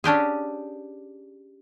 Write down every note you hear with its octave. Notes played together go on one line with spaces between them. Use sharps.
C#4 D4 G4 G#4